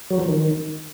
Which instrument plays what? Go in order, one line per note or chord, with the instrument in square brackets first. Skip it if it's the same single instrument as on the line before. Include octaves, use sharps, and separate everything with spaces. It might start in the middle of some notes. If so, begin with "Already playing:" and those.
[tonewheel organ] F#3
F3
D#3